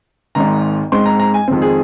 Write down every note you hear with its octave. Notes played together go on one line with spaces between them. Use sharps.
G#1 G#2 D#3 A#5
G#2 G#3 C4 C6
A#5
A#5
G#5
F2 D#3 G#3 C4
G#4